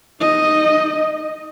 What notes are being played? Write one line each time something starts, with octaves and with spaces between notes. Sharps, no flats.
D#4 D#5